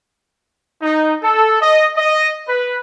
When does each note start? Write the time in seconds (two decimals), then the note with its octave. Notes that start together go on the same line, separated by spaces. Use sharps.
0.81 D#4
1.23 A4
1.61 D#5
1.97 D#5
2.48 B4